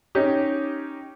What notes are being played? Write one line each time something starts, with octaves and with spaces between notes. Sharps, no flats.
C#4 D#4 G4